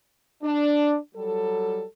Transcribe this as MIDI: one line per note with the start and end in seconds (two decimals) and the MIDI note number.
0.43 0.96 62
1.16 1.83 54
1.16 1.83 55
1.16 1.83 69